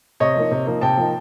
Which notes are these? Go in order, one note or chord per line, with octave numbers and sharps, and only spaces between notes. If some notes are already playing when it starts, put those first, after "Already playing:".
C3 C#5 D#5
F3 A#3 D#4
C3
F3 A#3 D#4
C3 G5 A5
F3 A#3 D#4